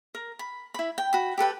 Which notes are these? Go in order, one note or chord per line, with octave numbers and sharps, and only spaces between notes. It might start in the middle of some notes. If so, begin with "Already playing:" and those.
A#4
B5
E4 B5
G5
F#4 B5
G4 A4 B4 G5